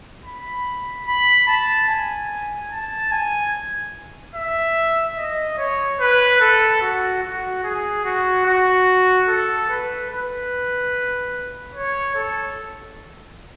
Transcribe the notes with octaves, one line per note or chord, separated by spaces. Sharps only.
B5
B5
A5
G#5
A5
G#5
E5
D#5
C#5
B4
A4
F#4
F#4
G#4
F#4
F#4
A4
B4
B4
C#5
A4